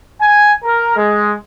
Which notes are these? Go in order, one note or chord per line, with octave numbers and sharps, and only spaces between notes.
G#5
A#4
G#3